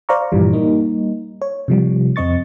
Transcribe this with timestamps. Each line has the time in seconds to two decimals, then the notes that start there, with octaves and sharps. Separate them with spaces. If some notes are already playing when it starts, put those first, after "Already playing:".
0.09 C5 D5 F5 A#5 C#6
0.32 G2 A#2 E3 F3 G3
0.53 G3 A#3 D#4
1.42 C#5
1.68 C3 F3 G3
2.16 F2 C4 D#5 C#6 A6